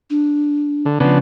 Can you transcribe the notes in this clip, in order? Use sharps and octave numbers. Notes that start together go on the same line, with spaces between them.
D4
D3
C#3 F3 B3 D4